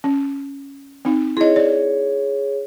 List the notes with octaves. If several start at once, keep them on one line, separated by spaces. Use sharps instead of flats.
C#4
C4 D#4
E4 G#4 C#5 D#5
D5